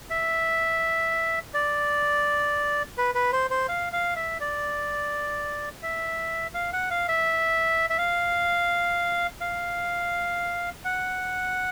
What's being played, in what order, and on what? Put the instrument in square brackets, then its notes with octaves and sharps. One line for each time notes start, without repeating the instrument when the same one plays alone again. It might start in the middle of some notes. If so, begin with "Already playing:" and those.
[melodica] E5
D5
B4
B4
C5
C5
F5
F5
E5
D5
E5
F5
F#5
F5
E5
E5
F5
F5
F#5